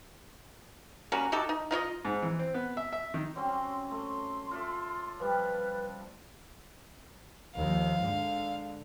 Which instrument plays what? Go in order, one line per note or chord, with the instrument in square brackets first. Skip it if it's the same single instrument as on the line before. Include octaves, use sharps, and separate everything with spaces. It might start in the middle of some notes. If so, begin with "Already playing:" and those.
[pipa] G3 A#3 C#4 F#4
D#4 F#4 G4 A4
D#4
D#4 F4 C#5 D#5
[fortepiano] G#2
E3
C4
B3
E5
E5
D#3
[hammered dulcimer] F#3 C4 C#4 [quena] C6
[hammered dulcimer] A3 [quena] C6
[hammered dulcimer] F4 D5 E5
[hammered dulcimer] F3 G3 [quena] B4
[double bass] D#2 F3 [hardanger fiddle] F5
[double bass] G#2 D3